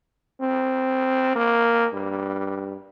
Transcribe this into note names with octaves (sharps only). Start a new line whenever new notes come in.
C4
A#3
G2